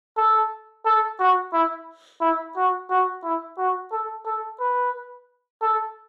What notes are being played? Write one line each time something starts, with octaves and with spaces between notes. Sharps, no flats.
A4
A4
F#4
E4
E4
F#4
F#4
E4
F#4
A4
A4
B4
A4